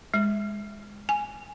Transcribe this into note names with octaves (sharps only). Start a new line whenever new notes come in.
G#3
G#5